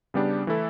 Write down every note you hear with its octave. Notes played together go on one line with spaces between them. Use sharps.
C#3 G3 B3 D4 G4
E3 A3 E4 A4